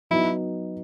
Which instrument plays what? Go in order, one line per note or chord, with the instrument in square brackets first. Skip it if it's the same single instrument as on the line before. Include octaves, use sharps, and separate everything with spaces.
[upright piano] F#3 B3 D#4 [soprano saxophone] E4